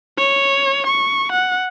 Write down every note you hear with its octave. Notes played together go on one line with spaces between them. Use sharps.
C#5
C#6
F#5